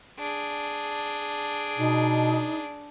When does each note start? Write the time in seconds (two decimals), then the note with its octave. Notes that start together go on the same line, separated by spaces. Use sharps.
0.18 D4 G#4
1.78 B2 D#4